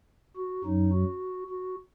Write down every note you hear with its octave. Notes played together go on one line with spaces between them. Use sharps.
F#4
F#2 F#3 D#4
F#4
F#4